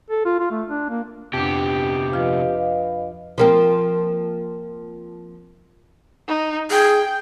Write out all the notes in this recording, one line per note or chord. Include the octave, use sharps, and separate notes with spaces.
A4
F4
F4
A3
D4
A#3
F2 C3 B3 D4 G4
F3 F4 B4 D#5 F5
F3 A#3 C4
D#4
G#4 G5